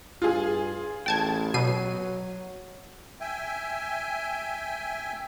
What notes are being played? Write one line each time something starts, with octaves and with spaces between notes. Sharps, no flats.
G2 F4 G#4
A1 G5 A5 G#6
B2 F#3 C7 D#7
E5 G5 G#5